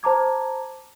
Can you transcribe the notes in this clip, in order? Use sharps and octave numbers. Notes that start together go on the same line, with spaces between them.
C5 A5 A#5 D6 G#6